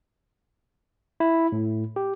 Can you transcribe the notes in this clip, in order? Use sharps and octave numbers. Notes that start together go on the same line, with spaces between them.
E4
A2
G4